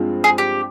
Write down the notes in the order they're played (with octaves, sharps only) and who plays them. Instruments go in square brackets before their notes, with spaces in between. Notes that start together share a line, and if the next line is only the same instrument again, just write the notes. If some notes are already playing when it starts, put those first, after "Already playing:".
Already playing: [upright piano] G2 F3 G#3 C4 F4
[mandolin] G#4
G4